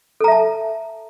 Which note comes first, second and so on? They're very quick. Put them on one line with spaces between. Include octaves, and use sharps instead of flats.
A4 A#5 E5 A5